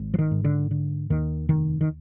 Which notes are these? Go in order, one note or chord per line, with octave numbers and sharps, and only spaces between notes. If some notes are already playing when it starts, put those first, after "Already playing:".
Already playing: G#1 G#2
F3
D#3
G#2
D3
D3
D#2 D#3
F1 D#3
D#3